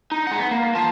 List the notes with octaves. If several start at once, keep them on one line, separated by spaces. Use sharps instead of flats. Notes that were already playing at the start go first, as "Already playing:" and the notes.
D#4
G#3 F#5
B3
A#3
F4 A5